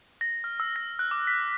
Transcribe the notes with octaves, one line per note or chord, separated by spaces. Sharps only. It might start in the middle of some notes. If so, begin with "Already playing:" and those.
A#6
F6
E6
A#6
F#6
D6
B6